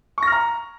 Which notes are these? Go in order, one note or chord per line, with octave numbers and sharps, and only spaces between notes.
A#5 C#6 F6 A#6